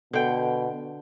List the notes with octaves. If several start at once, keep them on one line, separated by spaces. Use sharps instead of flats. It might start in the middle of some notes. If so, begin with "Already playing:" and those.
B2 D3 G5